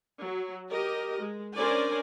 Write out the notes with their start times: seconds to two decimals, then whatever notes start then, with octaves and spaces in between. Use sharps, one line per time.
0.22 F#3
0.68 G4 A#4 D#5
1.20 G#3
1.54 C#4 D4 A#4 C5 D5 G#5